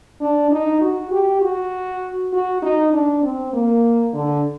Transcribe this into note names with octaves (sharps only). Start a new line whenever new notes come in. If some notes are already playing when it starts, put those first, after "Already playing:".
D4
D#4
F#4
G4
F#4
F#4
D#4
D4
C4
A#3
D3